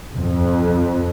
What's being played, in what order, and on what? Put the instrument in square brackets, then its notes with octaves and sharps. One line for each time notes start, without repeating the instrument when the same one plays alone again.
[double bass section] F2